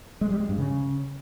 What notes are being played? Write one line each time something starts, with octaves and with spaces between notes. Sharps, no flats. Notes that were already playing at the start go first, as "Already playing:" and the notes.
G#3
G3
G#3
G2
C#3